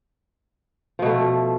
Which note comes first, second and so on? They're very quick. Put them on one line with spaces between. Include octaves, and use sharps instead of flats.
F3 B2 A3